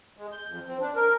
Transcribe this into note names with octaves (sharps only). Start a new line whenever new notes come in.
G#3
G6
F2
C4
D4
A#4